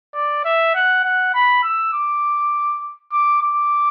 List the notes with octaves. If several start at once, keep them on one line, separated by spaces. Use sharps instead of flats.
D5
E5
F#5
F#5
B5
E6
D6
D6
D6